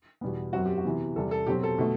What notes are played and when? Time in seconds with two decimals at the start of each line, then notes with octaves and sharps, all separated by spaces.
0.21 E2 B2 G3 B3
0.53 F#2 F#3 C4 F#4
0.66 G4
0.78 F#4
0.84 C3 E3 B3
1.16 E2 C3 G3 A4
1.31 A4
1.46 B2 F#3 C4 G4
1.63 A4
1.78 B2 A3